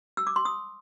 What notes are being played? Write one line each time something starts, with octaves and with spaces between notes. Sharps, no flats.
E6
D6
C6
D#6